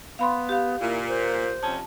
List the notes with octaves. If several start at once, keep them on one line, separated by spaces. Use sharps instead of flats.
B3 F5 B5 C6
G4 F5
A#2 E4
C5
F2 C3 C#4 A5